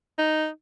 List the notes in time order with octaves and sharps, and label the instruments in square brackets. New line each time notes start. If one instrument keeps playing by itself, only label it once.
[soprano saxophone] D#4